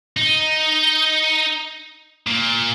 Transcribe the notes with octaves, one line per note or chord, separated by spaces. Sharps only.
D#4
A#2